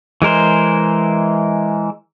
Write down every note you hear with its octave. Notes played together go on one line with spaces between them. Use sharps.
E3 G#3 A#4 C5